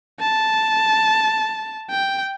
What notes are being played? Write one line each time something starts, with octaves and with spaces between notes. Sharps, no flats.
A5
G5